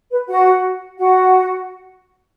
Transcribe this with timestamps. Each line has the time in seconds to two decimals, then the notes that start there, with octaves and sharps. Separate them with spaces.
0.11 B4
0.28 F#4 F#5
0.98 F#4 F#5